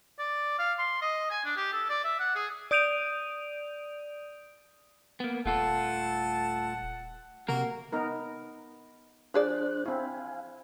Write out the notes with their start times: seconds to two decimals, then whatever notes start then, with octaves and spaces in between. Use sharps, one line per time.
0.19 D5
0.59 F5
0.79 C6
1.02 D#5
1.31 G#5
1.45 D4
1.57 G4
1.73 A4
1.89 D5
2.04 E5
2.19 F#5
2.35 G#4
2.71 D5 D#6 G6 D7 D#7 F7
5.20 A#3 B3
5.46 D#1 A3 F4 A4 F#5 A5
7.48 C3 A#3 C4 F#4 A#4
7.92 B3 D#4 A#4
9.34 F3 D4 G#4 C5 D5 F#6
9.86 C4 E4 F5 G#5